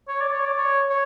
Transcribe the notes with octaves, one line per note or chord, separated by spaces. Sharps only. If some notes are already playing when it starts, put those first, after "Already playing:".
C#5
D5
C#5
D5
C#5
C#5